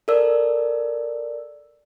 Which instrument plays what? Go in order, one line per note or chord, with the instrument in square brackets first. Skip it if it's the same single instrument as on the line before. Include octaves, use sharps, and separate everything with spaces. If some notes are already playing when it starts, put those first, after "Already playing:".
[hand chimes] A4 A#4 D5 E6